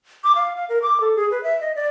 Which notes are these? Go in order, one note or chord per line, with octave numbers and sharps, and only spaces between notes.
D6
F5
F5
A#4
D6
A4
G#4
B4
E5
D#5
D5